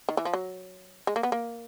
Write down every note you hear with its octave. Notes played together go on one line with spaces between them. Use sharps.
D#3
E3
F3
F#3
G#3
A#3
B3
A#3